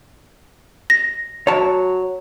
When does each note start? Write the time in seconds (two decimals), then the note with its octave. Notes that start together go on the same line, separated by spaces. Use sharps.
0.90 A#6
1.47 F#3 C#5 A5